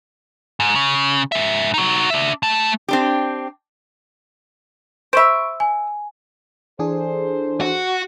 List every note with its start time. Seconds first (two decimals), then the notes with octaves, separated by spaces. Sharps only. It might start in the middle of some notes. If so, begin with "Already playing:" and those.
0.60 G#2
0.75 C#3
1.32 G#2 E5
1.74 D#4 F#4
2.10 D4 E5
2.43 A3 A5
2.88 C4 D4 G4
5.13 C5 E5 B5 C#6 D7
5.60 G#5
6.79 E3 D4 G#4 A4 C5
7.61 F#4